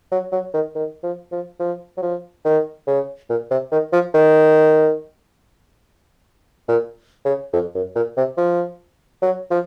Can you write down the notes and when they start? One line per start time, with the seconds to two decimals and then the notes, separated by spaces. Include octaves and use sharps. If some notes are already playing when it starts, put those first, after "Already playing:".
0.11 F#3
0.32 F#3
0.54 D#3
0.75 D#3
1.03 F3
1.31 F3
1.60 F3
1.97 F#3
2.02 F3
2.45 D#3
2.87 C#3
3.30 A#2
3.51 C3
3.71 D#3
3.93 F3
4.14 D#3
6.68 A#2
7.25 C#3
7.53 F2
7.75 F#2
7.95 A#2
8.17 C3
8.37 F3
9.22 F#3
9.51 F3